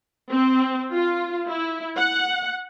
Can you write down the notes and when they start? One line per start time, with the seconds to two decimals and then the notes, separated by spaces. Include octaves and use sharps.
0.31 C4
0.94 F4
1.48 E4
1.97 F#5